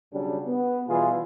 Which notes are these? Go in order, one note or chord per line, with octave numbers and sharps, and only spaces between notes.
B1 C#3 F#3 G3 D4
B3
B2 E3 G3 F4 G#4